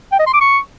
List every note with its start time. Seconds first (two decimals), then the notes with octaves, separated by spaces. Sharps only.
0.12 G5
0.19 D#5
0.26 C6
0.34 D6
0.41 C#6